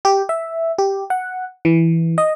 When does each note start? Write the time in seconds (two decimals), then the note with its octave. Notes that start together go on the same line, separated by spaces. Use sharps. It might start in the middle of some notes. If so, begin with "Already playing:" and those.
0.05 G4
0.29 E5
0.78 G4
1.10 F#5
1.65 E3
2.18 D#5